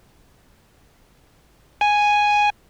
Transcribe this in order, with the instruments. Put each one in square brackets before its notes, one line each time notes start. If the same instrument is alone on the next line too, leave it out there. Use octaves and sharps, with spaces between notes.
[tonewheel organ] G#5